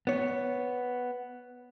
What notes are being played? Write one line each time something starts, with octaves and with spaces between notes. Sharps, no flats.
B3 C#5